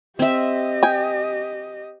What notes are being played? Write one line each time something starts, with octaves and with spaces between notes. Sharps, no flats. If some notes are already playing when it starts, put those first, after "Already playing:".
C4 G4 D#5 E5
G5 G#5